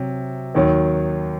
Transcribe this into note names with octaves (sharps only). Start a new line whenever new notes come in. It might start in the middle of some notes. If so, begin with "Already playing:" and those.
Already playing: C3 F#3
D#2 D#3 F#3